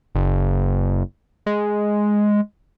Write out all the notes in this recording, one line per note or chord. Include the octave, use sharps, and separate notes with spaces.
F#1
G#3